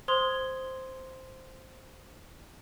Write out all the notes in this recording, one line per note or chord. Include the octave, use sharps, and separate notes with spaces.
C5 C6 D#6 G#6 G7